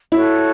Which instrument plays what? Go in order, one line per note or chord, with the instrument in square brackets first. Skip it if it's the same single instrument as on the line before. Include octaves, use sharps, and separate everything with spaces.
[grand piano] E4 [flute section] F#4 A4 C#5